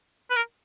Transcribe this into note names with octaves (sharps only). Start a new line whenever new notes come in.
B4
A#4